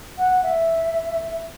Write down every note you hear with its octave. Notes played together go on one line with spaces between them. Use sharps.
F#5
E5